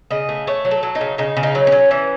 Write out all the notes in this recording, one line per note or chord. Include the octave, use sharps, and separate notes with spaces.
C#3 D#5
A3
A3 C#5
F#3
A4
F#3
D#4
C#3
C#3 D#4
C#3
D#4
F#3
C#4
F#3
E3